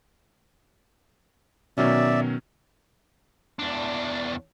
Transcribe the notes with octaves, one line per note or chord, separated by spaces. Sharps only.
B2 D#3 F#3 C#4 D5 E5
E2 D4